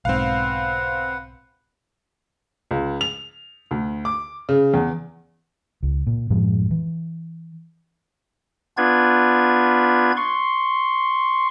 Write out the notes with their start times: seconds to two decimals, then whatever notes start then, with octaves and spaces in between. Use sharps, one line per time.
0.05 B1 G#2 C4 B4 F5 F#5
2.71 C#2
3.01 F7
3.71 D2
4.05 D6
4.49 C#3
4.74 E2
5.83 C#2
6.07 A#2
6.30 F#2 A2 F3 G#3
6.71 E3
8.77 B3 D4 F4 B4 G#6
10.17 C6 C#6